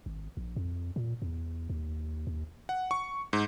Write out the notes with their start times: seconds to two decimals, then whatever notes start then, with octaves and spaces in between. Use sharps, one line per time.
0.06 G#1
0.37 A#1
0.56 F2
0.96 A#2
1.22 E2
1.70 D#2
2.27 D#2
2.69 F#5
2.91 C#6
3.33 G#2